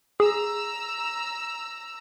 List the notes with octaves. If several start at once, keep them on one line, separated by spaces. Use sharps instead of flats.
G#4 A#5 E6